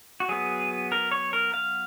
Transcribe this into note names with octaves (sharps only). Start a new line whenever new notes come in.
F#4
F#3 B3 G#4
A#4
C#5
A#4
F5